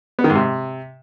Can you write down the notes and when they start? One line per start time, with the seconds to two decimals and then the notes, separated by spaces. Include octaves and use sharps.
0.19 B3
0.24 D#3
0.30 G#2
0.35 C3